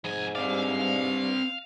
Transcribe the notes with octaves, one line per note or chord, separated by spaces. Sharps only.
F2 G#2 G#5
G2 C4 D5 F5